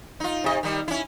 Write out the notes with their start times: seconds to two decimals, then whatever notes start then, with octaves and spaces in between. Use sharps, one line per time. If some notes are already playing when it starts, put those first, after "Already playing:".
0.20 D#4 F4
0.44 C3 D#5
0.63 D#3 G3
0.88 C#4 E4